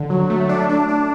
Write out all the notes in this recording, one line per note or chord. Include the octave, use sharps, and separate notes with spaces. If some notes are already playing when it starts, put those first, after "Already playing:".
Already playing: D3
F#3
A3
D4
D4
D4